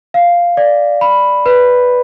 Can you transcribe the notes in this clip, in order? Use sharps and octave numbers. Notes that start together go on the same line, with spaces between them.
F5
D5
B5
B4